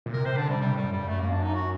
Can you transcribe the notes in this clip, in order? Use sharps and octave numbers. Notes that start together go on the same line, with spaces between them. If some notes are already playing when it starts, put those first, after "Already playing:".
A#2
C3 A#4
C3 C5
D3 D4
C3 G3
C3 G3
A2 G3
F#2
G2 G3
F#2 A3
A#3
D4
D#4
F#4